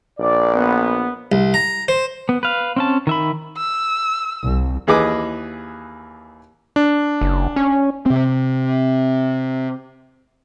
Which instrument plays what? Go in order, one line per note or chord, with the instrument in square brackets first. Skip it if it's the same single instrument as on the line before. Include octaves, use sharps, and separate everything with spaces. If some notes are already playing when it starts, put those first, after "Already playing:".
[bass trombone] A#1 [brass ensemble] D5
[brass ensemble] B3
[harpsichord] C2
A#5
C5
[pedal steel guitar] B3
B4 F5
C4 C#4 A5
D#3 E5 B5
[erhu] E6
[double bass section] C2
[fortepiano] D#2 E3 G#4 B4 D#5 D6
[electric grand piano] D4
[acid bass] F#1
C#4
[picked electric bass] C3 C4